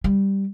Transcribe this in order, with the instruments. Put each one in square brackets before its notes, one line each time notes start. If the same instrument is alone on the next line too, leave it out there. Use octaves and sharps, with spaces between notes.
[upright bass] G3